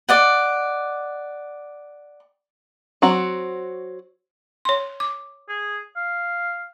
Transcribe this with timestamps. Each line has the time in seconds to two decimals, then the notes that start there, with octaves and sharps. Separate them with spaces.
0.09 D5 D#5 F#5
3.02 F#3 C4 F#4
4.65 C#5 C6
5.00 D6
5.49 G#4
5.96 F5